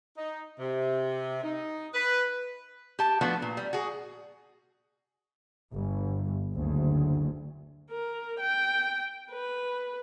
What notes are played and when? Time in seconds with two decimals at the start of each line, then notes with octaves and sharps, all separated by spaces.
0.16 D#4
0.59 C3
1.43 D#4
1.94 B4
2.99 G4 A5
3.21 F3 A3 B3 D4 F#4
3.42 A#2
3.57 G3
3.73 F#4 G#4
5.72 G1
6.52 F#1 D2
7.90 A#4
8.39 G5
9.31 B4